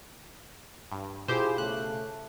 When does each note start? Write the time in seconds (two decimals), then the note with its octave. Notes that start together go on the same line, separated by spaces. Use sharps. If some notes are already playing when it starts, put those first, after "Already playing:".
0.92 G2
1.28 B2 E4 F4 G4 G#4 C5
1.58 C#3 A3 F#6